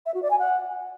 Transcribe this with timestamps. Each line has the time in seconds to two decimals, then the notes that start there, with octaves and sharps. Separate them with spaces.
0.06 E5
0.14 F#4
0.22 D5
0.31 G#5
0.39 F#5